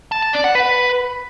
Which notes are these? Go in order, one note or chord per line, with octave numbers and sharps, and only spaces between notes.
A5
A5
D5
F#5
B4